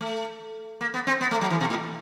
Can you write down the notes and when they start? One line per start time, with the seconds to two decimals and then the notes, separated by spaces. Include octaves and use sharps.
0.01 A3
0.81 A#3
0.94 B3
1.07 C4
1.21 B3
1.31 A3
1.41 F#3
1.50 E3
1.60 B2
1.70 A2